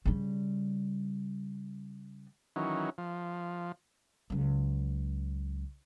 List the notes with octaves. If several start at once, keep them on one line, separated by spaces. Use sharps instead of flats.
C#3 G3
D#3 E3 F#3 C#4
F3
C#2 F#3